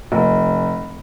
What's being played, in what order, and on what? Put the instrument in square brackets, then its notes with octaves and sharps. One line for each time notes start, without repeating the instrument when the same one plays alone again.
[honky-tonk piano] F1